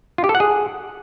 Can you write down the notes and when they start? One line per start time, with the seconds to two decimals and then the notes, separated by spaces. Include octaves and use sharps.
0.18 F4
0.24 G4
0.29 A4
0.35 F#5
0.40 G#4